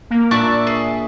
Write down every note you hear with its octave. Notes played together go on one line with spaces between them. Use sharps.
A#3
A#2 D4 F4 D5 E5 C#6 F#6
G#4